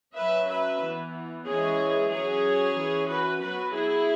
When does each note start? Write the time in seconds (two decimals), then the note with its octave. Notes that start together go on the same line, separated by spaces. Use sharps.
0.15 F#3 C#4 B4 E5
0.49 B4 E5
0.81 E3 B3
1.46 E3 G#3 C#4 G#4 C#5
2.11 F#3 C#4 G#4 C#5
2.76 E3 C#4
3.09 F#4 B4
3.41 F#3 B3 F#4 B4
3.74 E4 G#4